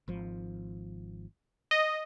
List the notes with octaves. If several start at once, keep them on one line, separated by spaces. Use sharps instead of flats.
G#1 F3
D#5